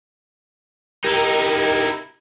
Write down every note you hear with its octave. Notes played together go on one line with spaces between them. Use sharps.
D#4 E4 G4 A#4